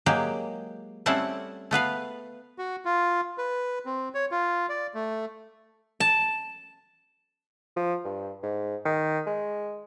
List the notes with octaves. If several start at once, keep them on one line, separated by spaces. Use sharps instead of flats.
F#3 G#3 A#3 G4
G3 A3 C4 C#4 E4 F#5
A3 B3 B4 F5
F#4
F4
B4
C4
C#5
F4
D5
A3
A5
F3
G2
G#2
D#3
G#3